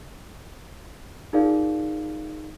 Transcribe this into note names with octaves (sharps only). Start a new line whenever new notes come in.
D#4 F4 G#4 A#4 D5 F5